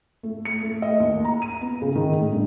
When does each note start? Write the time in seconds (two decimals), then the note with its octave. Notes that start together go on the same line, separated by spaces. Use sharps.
0.23 A3
0.45 C#7
0.62 A3
0.82 D#5
1.00 D#2
1.25 A#5
1.42 D#7
1.61 B3
1.82 C#3
1.95 D#3
2.20 A2
2.33 G2